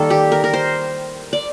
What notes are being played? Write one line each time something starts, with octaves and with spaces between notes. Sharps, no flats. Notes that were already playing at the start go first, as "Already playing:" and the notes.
Already playing: D#3 G3 A#3 A4
G4
A#4
A#4
C5
D5